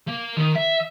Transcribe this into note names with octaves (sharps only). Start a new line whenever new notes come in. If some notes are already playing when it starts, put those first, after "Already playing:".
A#3
D#3
E5